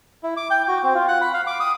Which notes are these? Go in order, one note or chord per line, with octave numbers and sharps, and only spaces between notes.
E4
D6
G5
F#4
C4
F4
F#5
B5
F5
D6
D#6